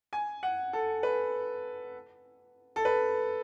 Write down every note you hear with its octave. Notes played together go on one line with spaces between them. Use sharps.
G#5
F#5
A4
B4
A4
B4